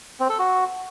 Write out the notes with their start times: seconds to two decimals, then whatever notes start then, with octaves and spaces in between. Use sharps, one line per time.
0.20 C4
0.29 A4
0.39 F#4